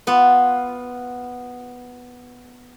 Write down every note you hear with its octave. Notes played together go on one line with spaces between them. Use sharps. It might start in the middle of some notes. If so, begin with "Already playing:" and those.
B3 F4